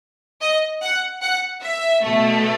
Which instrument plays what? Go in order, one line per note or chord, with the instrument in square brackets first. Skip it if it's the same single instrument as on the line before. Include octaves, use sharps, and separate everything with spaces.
[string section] D#5
F#5
F#5
E5
B2 A3